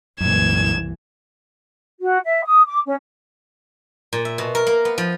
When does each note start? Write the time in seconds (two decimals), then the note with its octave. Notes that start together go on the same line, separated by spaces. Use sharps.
0.20 F#1 C2 F#2 A#2 E3 G#6 E7
2.01 F#4
2.25 E5
2.44 D#6
2.66 D6
2.85 C#4
4.13 A#2
4.25 E5
4.38 B2
4.55 A#4
4.67 A#3
4.85 B3
4.98 F3